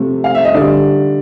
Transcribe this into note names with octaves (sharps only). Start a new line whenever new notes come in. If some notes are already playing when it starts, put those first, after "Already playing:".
Already playing: C3 F3 A3
F5
E5
D#5
D3 G3 D5